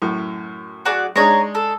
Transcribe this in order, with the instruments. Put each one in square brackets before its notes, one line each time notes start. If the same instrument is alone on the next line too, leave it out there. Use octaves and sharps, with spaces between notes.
[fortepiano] F#2 A2
[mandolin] F#4 G#4 D5
[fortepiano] G#3 D4 D#4 [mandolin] G#4 C#5 A#5
[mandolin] A4